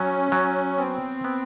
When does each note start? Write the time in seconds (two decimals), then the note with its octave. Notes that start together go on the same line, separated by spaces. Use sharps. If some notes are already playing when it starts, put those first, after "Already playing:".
Already playing: F#3 C#4
0.32 F#3
0.78 B3 C4
1.24 B3